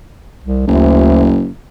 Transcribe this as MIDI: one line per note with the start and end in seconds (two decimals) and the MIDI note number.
0.44 0.65 36
0.67 1.49 30
0.67 1.37 38